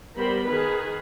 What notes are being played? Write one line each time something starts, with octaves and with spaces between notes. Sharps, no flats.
G3 B3 A#4 C5 B5
D#3 G#4 B4